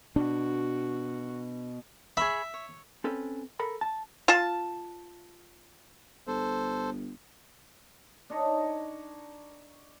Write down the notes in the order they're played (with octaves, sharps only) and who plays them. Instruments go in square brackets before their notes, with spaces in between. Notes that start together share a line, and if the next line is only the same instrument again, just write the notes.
[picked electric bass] B2 [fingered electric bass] D4 [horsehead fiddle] F#4
[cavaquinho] G#4 C#5 B5 [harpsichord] E5
[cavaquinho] C#5
[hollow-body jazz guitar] C4 C#4 A4 B4
A4 A#4 B5
A5
[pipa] F4 A5
[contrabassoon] G1 [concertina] A4 C5
[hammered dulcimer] D4 D#4 C#5 D#5